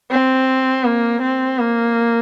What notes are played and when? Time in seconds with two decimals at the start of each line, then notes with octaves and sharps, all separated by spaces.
0.11 C4
0.84 A#3
1.22 C4
1.59 A#3